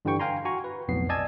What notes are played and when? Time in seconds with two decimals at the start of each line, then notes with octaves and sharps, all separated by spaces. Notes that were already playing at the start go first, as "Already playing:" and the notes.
0.05 G2 D3 E3 G3 G5 C#6
0.19 F5 G5 G#5 A#5 C6
0.45 F#4 G#5 A#5 C#6
0.64 B4
0.88 B1 F2 A2 B3 C7
1.09 D5 D#5 G#5 A5 E6 G#6